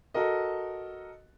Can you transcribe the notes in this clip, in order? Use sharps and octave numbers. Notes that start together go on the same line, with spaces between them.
F#4 A4 A#4 D#5